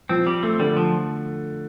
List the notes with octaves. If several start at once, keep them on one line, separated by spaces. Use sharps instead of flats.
F3 C4
G3
A3 C4
D3 G3
F3